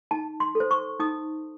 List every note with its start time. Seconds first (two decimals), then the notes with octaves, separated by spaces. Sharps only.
0.11 D#4 A5
0.40 C6
0.55 A4
0.60 C5
0.71 C#6
1.00 D#4 D#6